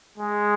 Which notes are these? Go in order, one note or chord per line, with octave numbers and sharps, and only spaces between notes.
G#3